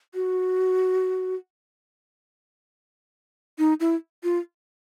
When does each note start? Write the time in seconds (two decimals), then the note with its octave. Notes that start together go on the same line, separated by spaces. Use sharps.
0.15 F#4
3.59 D#4
3.80 E4
4.23 F4